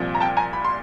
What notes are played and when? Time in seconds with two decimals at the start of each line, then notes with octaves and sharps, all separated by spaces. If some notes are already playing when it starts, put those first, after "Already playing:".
Already playing: C2 A#2 F3
0.15 A#5
0.20 G5 A5
0.37 G#5 A#5
0.53 B5
0.65 C6